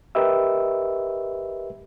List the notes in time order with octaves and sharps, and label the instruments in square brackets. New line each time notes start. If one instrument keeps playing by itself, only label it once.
[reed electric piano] G4 A#4 B4 D#5 E5 E6